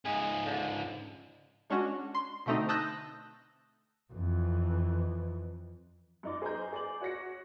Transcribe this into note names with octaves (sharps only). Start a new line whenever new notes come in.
C#2 G#2 G#4
D3
G#3 C#4 D4 F#4
C6
B2 D3 A3 C4 D#4
A5 D#6 E6 F#6 G6 A#6
F2 E3
F#2 D#4 D5
G#4 C5 D#5 G#5 A#5 G6
G#4 D5 G#5 F#7
F#4 C#5 A#6 C#7